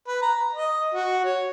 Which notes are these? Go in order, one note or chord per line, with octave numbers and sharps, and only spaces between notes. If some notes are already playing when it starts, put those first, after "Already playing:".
B4
A#5
D#5
F#4
C#5